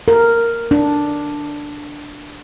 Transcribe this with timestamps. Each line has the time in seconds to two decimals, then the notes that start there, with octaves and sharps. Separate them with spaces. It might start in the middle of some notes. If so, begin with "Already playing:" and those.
0.08 A#4
0.71 D4